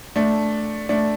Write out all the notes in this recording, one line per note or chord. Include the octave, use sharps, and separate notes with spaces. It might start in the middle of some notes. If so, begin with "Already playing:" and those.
A3 D4
A3 D4